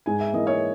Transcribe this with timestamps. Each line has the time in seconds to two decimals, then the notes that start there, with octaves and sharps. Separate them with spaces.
0.06 G#2 G#5
0.20 E5
0.33 E3 A#3 D#5
0.47 C#5